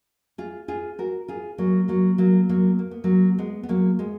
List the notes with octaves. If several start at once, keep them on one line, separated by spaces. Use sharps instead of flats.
F4 G#4
F4 G#4
F#4 A#4
F4 G#4
F#3 A#3
F#3 A#3
F#3 A#3
F#3 A#3
A#3
B3
F#3 A#3
G#3 B3
B3
F#3 A#3
G#3 B3